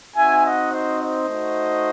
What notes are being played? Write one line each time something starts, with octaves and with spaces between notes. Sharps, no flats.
C4 D#4 F#4 E5 G#5
D#5 F#5
C5 D#5
C5 D#5
A3 D#4 F#4